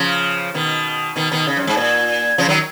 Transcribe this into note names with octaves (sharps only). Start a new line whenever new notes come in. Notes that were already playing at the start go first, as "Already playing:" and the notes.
Already playing: C#3 F3
B2 D#3
B2 D#3
B2 D#3
C#3
F#2
G#2
A#2
C#3 F3
D#3 F#3